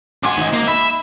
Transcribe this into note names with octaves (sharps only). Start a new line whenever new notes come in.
C#2 F#5 G#5 C6 D6
G#1 D#5
A#3
E5 B5